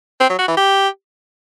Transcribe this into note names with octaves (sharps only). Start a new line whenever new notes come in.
C4
F#3
F#4
E3
G4